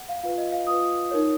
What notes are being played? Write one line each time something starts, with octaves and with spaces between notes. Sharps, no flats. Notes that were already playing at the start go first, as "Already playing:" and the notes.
Already playing: F#5
F5
F4 B4 F5
D#5
F5
F4 B4 D#6
D#4 A#4 C#5